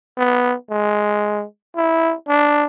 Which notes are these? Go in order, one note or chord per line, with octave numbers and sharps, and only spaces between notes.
B3
G#3
E4
D4